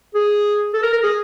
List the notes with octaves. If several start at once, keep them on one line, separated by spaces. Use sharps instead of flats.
G#4
A4
A#4
A#4
G#4